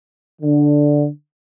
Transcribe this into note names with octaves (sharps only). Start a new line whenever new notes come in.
D3